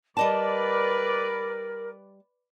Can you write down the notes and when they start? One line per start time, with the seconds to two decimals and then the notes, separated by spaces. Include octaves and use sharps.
0.17 G3 A#4 B4 D5 D#5 A5